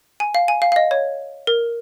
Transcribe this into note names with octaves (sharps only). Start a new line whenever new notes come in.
G#5
F5
G#5
F5
F5
D#5
C#5
A#4